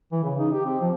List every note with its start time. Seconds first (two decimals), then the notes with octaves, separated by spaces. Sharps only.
0.12 E3
0.23 C#3
0.39 D#4
0.53 G4
0.65 C4
0.81 F3